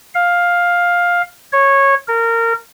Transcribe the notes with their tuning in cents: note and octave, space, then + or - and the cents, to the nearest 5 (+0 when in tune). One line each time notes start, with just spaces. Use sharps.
F5 +10
C#5 -15
A#4 -20